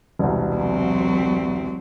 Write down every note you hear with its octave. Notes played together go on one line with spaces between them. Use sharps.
E1 C2
F#3 C4